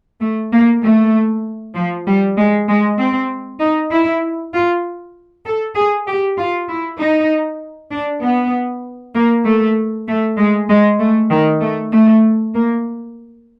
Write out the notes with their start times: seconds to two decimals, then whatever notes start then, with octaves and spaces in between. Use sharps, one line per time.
0.21 A3
0.52 A#3
0.83 A3
1.75 F3
2.07 G3
2.37 G#3
2.68 G#3
2.98 C4
3.60 D#4
3.90 E4
4.53 F4
5.45 A4
5.75 G#4
6.07 G4
6.38 F4
6.68 E4
6.99 D#4
7.91 D4
8.23 B3
9.14 A#3
9.45 A3
10.07 A3
10.37 G#3
10.69 G#3
10.99 A3
11.30 D#3
11.61 A3
11.91 A3
12.54 A#3